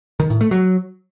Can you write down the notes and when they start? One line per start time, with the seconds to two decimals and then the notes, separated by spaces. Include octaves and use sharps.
0.20 D#3
0.30 A2
0.41 A3
0.51 F#3